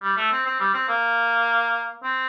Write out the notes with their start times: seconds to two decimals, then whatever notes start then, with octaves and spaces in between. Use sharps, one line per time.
0.03 G3
0.17 A3
0.31 C4
0.46 C4
0.60 G3
0.74 C4
0.89 A#3
2.03 C4